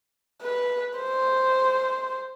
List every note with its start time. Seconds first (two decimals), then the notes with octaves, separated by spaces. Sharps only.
0.42 B4
0.98 C5